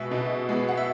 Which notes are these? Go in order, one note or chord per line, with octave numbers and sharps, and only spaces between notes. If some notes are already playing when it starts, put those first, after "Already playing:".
Already playing: B2 G#3 B3 E5 F#5 G#5
B2 D#5
G#3 B3
F#5
E5